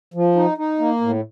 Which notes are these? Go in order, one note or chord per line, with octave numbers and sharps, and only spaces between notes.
F3
D#4
D#4
A#3
A2